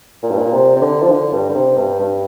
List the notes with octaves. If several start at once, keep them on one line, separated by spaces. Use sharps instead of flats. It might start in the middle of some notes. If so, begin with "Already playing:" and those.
A#2
G2
A#2
C3
C3
D3
F3
D3
G2
D3
C3
G2
G2